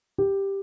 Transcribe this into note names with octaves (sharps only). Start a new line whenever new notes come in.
G4